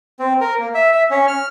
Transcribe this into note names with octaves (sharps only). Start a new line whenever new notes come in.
C4
A#4
A#3
E5
E5
C#4
F6